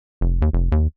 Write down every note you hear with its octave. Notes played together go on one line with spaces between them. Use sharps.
F1
D#2
F1
D#2